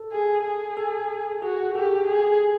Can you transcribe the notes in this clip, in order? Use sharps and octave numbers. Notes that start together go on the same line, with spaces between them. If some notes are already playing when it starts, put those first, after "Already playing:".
Already playing: A4
G#4
G#4
A4
F#4 G#4
G4 A4
G#4